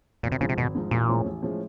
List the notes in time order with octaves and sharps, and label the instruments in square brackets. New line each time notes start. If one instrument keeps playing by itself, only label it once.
[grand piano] G#1 [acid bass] A#2
[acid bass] C3
[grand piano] G#2 F3 [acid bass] C#3
[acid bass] C3
[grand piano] G#1 [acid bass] B2
[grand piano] G#2 F3
[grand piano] A1 [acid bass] A#2
[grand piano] A2 F3 G#3 C#4
A1
A2 F3 G#3 C#4